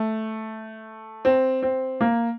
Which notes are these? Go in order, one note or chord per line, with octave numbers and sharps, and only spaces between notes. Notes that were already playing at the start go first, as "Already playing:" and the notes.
Already playing: A3
C4
C4
A#3